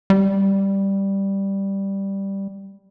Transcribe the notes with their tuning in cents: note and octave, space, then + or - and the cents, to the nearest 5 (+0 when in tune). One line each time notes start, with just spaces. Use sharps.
G3 +0